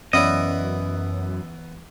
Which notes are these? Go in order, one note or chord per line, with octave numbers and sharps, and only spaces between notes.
F#2 E3 B3 C#4 E4 D5 D#5